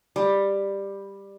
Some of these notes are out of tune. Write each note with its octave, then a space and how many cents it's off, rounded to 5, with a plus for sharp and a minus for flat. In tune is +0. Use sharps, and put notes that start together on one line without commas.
G3 +10